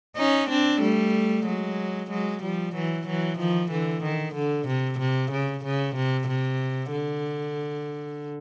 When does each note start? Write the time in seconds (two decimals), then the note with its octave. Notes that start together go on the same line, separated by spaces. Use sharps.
0.17 C#4 D#4
0.49 C4 D4
0.81 G3 A3
1.45 F#3 G#3
2.10 F#3 G#3
2.42 F3 G3
2.75 E3 F#3
3.06 E3 F#3
3.38 D#3 F3
3.70 D3 E3
4.04 D#3
4.35 D3
4.68 C3
4.99 C3
5.32 C#3
5.65 C#3
5.96 C3
6.28 C3
6.92 D3